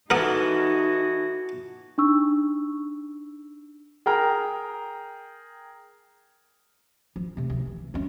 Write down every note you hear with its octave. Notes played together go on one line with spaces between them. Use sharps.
E3 D#4 F#4 A4 A#4 F#5 D#6
D4 D#4 C#6 E6
G#4 A#4 G5 A#5 F6
F3
C3 A3
D2
E3
G#3 C#4